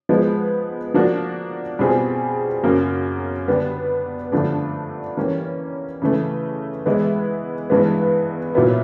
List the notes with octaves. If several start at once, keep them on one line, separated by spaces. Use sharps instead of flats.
F3 G#3 B3
F3 A#3 D4 F#4
B2 G3 C4 F4 G#4
F#2 C#3 F#3 A#3
D3 G3 B3 D4
G2 D3 F3 A3 D4
E3 G3 A#3 C#4
C#3 E3 A3
E3 G#3 B3 E4
G2 E3 G#3 B3
A#2 F#3 B3 E4